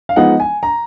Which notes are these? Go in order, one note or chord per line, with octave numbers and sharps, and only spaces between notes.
F5
F3 G#3 B3 D#4 F#5
G#5
A#5